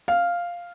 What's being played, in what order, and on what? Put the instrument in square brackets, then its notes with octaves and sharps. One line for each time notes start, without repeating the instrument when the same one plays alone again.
[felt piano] F5